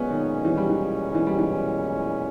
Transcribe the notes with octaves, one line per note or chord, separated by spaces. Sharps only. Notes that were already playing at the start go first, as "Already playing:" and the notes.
Already playing: B1 A#2 G#3 B3 C#4
D#3
E3
G3
E3
E3
G3
E3